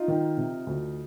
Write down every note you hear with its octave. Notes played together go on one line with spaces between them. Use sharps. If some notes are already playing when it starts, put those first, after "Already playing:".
Already playing: D#4 F4
D#3
C3
D2